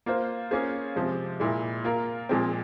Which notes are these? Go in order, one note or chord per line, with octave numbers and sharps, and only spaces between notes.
A#3 F4 C5
A#3 C#4 F4 G#4 C5
C3 F3 G#3
A#2 G#3 E4
A#3 F4 A#4
A#2 F3 G#3 C4